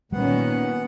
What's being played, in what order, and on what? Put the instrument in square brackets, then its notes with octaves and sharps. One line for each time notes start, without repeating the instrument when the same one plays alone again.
[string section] A#2 D#3 C#4 [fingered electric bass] G3 [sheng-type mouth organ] B3 F#5